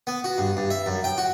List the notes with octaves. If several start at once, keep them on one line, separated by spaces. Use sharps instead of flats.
B3
F#4
G2
G2
E5
F#2
G5
F#4